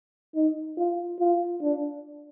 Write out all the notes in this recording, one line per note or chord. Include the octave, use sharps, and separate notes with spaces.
D#4
F4
F4
D4